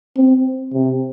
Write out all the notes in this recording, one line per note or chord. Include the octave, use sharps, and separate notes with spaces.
C4
C3